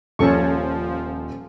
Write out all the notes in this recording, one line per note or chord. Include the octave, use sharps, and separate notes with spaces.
D#1 F3 C#4 A4 C#6